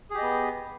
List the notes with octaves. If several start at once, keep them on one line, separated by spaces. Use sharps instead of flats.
B3 G4 G#4 D#5